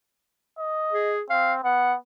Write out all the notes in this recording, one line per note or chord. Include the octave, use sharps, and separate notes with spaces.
D#5
G#4
C4 F5
B3 F#5